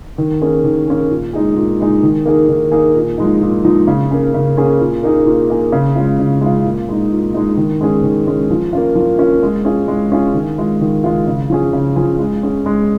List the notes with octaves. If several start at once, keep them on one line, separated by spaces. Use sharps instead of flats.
D#3
A#3 C#4 G#4
D#3
A#3 C#4 G#4
A#2
G#3 D#4 G#4
A#2
G#3 D#4 G#4
D#3
A#3 D#4 G#4
D#3
A#3 D#4 G#4
A#2
F3 G#3 D#4
A#2
F3 G#3 D#4
C#3
A#3 C#4 G#4
C#3
A#3 C#4 G#4
A#2
A#3 D#4 G#4
A#2
A#3 D#4 G#4
C#3
G#3 C#4 F4
C#3
G#3 C#4 F4
A#2
G#3 D#4
A#2
G#3 D#4
D#3
G#3 C#4 G#4
D#3
G#3 C#4 G#4
F3
A#3 C#4 F4
F3
A#3 C#4 F4
G#3
C#4 F4 G#4
G#3
C#4 F4 G#4
D#3
G#3 F4
D#3
G#3 F4
C#3
F3 C#4 G#4
C#3
F3 C#4 G#4
G#3
C#4 G#4
G#3